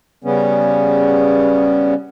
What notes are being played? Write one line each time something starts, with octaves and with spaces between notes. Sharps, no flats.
C#3 G3 B3 C#4